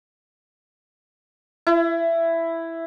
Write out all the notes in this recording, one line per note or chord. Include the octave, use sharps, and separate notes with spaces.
E4